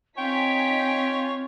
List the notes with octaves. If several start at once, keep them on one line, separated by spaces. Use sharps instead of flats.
C4 D#4 F4 C#5 G5 G#5 B6